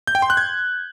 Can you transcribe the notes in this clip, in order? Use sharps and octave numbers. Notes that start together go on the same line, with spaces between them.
G6
G5
C6
F#6
G#6